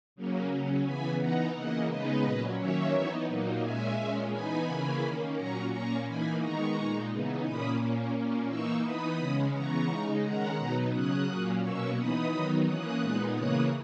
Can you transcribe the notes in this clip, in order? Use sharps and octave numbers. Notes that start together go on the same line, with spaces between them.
C#3 F#3 A#3 C#4
C#3 F#3 C#4
C#3 E3 B3 G#5 B5
E3 B3 D#4 F#5 A#5
C#3 E3 A#3 D#5 F#5
C#3 G#3 B3 D#4 B4 D#5
A#2 F#3 C#4
D#3 F#3 A#3 C#4 C#5 E5
E3 B3 D#4
A#2 F#3 A#3 D#4
A#2 G#3 C#4 E5 G#5
A#2 G#3 C#4
E3 B3 D#4 G#5 B5
C#3 E3 A#3 C#4
D#3 A#3 C#4
A#2 F#3 C#4 A#5 C#6
A#2 A#3 C#4 A#5 C#6
E3 A#3 D#4 G#5 B5
D#3 G#3 B3 D#4 A#5 C#6
A#2 G#3 D#4
C#3 E3 B3 D#4
A#2 A#3 C#4 B5 D#6
A#2 A#3 C#4
A#2 A#3 C#4
E3 A#3 D#4 C#6 E6
E3 B3 D#4 B5 D#6
C#3 G#3 C#4
C#3 E3 B3 A#5 C#6
C#3 G#3 D#4
D#3 G#3 C#4 F#5 A#5
B2 F#3 B3 D#4
C#3 F#3 C#4 D#6 F#6
A#2 F#3 A#3 C#4
B2 F#3 A#3 C#4 C#6 E6
E3 B3 D#4 B5 D#6
D#3 F#3 B3 D#4
E3 A#3 C#4 D#6 F#6
A#2 G#3 B3 D#4
C#3 E3 A#3 C#4 D#6 F#6